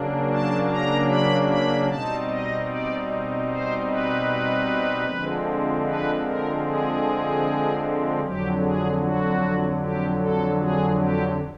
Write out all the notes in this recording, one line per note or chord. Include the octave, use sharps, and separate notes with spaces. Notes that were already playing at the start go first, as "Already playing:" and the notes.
Already playing: C#3 F#3 A#3 D4
A5
A#5
B5
B5
B2 G3 C4 D#4 A5
D#5
D5
C5
B4
D3 F3 G#3 C4
B4
A#4
G#4
F2 D3 F#3 G4
G#4
F#4
G4
A4
G#4
G4